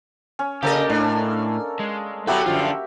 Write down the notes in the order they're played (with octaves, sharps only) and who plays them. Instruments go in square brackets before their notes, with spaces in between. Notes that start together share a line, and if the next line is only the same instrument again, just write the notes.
[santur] C#4
[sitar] C#3 C5 D#5 [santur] A#3 A4 A#4 [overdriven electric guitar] G4
[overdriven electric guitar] A2 [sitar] D4
[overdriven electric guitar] G#3
[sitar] F#3 B3 E4 [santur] F#4 G4 E5 [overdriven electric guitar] A4 A#5
[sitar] F#2 D3 F3 [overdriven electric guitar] F4